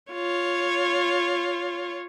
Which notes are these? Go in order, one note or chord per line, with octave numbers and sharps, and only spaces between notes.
F4 C#5